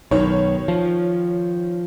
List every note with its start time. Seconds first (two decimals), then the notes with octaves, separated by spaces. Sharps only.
0.11 B1 D#3 C#5
0.68 F3